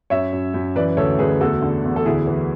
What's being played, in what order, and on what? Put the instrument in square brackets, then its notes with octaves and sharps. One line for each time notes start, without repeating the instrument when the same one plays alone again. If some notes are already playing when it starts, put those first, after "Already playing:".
[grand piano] F#2 C#5 E5
F#2
F#2
E3 B4 D5
D2 A4 C#5
D2 G#4 B4
E2 F#4 A4
D3
E2
A4
D2 E4 G#4
E3